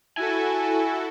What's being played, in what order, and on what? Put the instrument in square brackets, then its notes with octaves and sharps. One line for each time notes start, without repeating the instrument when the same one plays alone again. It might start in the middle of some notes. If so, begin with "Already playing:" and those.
[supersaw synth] E4 F#4 A4 [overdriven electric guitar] G#5